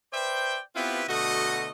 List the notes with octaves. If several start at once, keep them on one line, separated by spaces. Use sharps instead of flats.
B4 C5 D5 E5 G5
B3 C4 E4 F4 G4 B4
B2 D3 A3 F#4 D#5